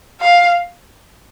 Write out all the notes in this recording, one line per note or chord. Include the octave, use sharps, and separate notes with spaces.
F5